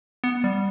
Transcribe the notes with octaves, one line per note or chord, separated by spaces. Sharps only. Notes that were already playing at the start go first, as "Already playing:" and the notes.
B3
G3